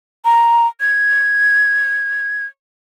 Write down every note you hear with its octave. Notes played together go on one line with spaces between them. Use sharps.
A#5
G#6